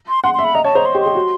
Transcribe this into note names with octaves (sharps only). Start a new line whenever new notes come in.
C6
F#5 C6
C6
E5
B5
D#5 A#5
C#5 A5
C5 A#5
C6
G4
C6
G4
F#4